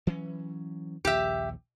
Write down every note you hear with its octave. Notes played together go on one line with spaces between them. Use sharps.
E3 F#3 C#4
A#1 D#2 G4 E5